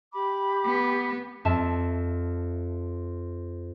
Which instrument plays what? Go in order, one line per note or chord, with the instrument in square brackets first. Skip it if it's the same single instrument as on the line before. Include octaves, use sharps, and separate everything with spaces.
[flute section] G4 B5 D6
[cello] B3
[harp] F2 E5 A5